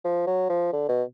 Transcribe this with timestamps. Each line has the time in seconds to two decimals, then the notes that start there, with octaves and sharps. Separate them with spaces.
0.04 F3
0.27 F#3
0.49 F3
0.73 D3
0.89 B2